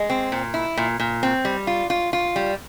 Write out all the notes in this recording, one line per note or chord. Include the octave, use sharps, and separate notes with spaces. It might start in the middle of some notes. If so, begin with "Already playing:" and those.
Already playing: G#3
C4
A#2
E4
A#2
A#2
C4
G3
F4
F4
F4
G3